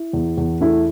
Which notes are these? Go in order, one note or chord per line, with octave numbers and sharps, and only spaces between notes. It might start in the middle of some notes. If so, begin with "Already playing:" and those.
Already playing: E4
E2
E2
A3 E4